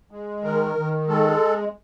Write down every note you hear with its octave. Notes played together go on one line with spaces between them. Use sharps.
G#3
D#3 A#4
D#3
G#3 A4